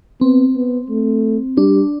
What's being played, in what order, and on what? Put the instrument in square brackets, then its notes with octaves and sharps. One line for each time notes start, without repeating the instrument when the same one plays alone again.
[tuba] B3 [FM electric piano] C4
[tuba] B3
A3
[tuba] G3 [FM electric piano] D4